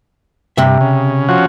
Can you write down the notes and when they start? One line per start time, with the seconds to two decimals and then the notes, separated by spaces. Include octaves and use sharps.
0.57 G2 C3 E5
0.81 C#3
1.29 F3 C#4 F#4